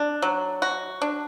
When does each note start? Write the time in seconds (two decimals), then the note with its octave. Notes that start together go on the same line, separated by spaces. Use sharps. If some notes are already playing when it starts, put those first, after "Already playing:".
Already playing: D4
0.22 F#3
0.62 F#4
1.02 D4